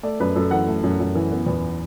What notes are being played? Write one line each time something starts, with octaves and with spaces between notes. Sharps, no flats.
A3 D5
F#2 B4
F#2 A4
E3 F#5
A3
F#2
F#2
E3
B3
E2